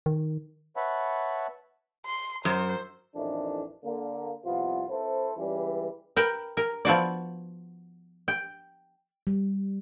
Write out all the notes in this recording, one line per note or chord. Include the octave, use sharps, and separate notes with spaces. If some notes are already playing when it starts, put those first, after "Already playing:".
D#3
B4 C#5 E5 F#5 A5 B5
C6
F#2 C5
A1 F2 D#3 E3 D4 E4
D3 A#3
C2 C3 F3 B3 F4
C4 E4 A4 B4 C5
C#2 E3 G3
A#4 B4 G5
A#4
F3 B3 F#4 D5
G5
G3